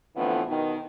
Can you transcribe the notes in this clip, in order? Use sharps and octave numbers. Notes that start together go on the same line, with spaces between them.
F2 A2 D3 E3 F3 B3
B2 D#3